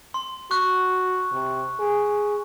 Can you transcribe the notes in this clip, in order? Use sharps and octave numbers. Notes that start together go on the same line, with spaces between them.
C6
F#4 C#6 F#6
C3
G#4